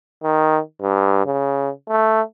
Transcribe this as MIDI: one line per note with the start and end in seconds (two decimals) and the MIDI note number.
0.23 0.59 51
0.81 1.22 43
1.26 1.70 49
1.89 2.21 57